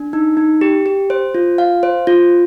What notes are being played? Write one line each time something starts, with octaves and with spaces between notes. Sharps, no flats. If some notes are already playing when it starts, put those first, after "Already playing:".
Already playing: D4
D#4
D#4
G4
G4
C5
F4
F5
C5
F4